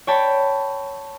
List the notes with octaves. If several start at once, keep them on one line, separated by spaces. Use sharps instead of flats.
C#5 D5 G5 A5 B5